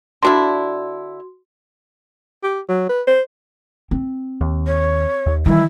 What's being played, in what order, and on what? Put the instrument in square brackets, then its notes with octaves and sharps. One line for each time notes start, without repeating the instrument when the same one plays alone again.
[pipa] D3 D4 E4 [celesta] F#4 C6
[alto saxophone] G4
F#3
B4
C5
[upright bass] C4
[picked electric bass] D#2
[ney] C#5
[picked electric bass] D#2
[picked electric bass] D#3 E3 [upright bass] G3 [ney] E4